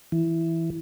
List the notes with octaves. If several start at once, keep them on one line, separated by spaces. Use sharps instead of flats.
E3